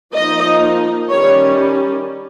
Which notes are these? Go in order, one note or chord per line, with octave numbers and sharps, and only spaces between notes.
F3 A#3 D#4 D#5
D#3 G3 C#4 C#5